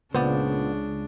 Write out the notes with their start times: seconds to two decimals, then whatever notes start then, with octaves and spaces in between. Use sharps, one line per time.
0.14 C#2 A#2 C#3 B3 D4 C5 D5